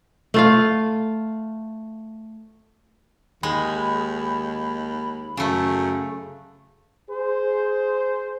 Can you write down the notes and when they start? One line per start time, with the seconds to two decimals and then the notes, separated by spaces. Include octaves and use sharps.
0.34 A3 F4 F5
3.43 D#2 G#3 B5
5.37 F#2 C#3 A3
7.10 G#4 C5